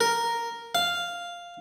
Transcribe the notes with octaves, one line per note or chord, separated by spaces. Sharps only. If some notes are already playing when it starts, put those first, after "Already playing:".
A#4
F5